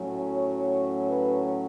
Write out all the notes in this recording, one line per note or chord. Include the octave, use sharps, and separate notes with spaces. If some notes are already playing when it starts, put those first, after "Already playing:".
Already playing: A2 F#3 C#4
C#5
B4